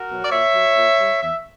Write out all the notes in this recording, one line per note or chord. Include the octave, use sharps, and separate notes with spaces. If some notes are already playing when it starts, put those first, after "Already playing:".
Already playing: F#4 A#4
B2 F#3
D5
A#2 C#5 E5
F#3
A#2
G3
E2 E5